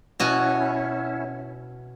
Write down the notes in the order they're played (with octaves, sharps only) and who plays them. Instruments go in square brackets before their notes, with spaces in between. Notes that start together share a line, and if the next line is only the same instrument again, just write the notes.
[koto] B2 F#4 G#5 [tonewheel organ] C#4 E4